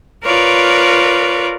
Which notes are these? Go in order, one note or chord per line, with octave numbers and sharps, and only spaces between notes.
F4 A#4 B4 C#5 D5